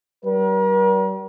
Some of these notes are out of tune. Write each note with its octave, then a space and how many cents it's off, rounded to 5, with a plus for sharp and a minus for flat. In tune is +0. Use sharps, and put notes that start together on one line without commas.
G3 -45 A#4 +40